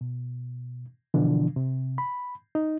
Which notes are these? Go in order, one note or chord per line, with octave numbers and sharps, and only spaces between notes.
B2
B2 D3 E3 F3 D4
C3
B5
D#4